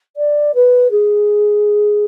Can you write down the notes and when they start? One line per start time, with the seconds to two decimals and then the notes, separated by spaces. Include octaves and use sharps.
0.16 D5
0.54 B4
0.90 G#4